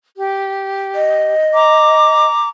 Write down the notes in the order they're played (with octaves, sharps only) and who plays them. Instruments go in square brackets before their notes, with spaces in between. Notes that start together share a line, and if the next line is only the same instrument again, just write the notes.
[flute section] G4
[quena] D#5
[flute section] A#5 D6